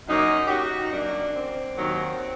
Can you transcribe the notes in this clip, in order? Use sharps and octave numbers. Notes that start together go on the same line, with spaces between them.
F#2 F#3 A#3 D#4
G4
F#4
D#4
F#2 F#3 A#3 D4
C4
D#2 D#3 F#3